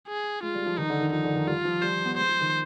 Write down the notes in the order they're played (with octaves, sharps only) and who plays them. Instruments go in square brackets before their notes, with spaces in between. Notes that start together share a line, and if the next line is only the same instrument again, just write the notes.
[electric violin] G#4
[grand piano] G#3 [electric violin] F4
[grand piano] G3
F3
[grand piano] D#3 [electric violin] D#4
[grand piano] D3
D#3
[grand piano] F3 [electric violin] D#4
[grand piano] D3
D#3
[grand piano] G3 [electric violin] F4
[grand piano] F3
[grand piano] G3 [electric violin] C5
[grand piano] B3
[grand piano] G#3 [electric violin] C5
[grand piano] F3
D#3